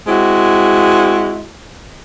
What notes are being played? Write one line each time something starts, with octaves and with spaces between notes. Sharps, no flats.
G#3 C4 E4 F#4